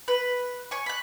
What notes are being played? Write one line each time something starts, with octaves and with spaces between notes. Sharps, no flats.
B4
C#5 G#5 C#6
B5 F#6